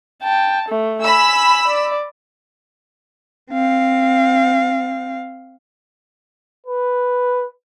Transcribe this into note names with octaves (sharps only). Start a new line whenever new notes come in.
G5 A5
A3
G#5 B5 E6
D5
C4 F5
B4